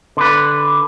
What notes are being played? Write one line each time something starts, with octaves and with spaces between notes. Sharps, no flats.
D3 B4